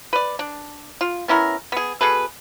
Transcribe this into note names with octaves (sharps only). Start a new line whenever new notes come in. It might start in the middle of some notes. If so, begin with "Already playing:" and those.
B4 D5
D4
F4
B3 C#4 E4 A#4
B3 G#4
B2 G#4 A4 B4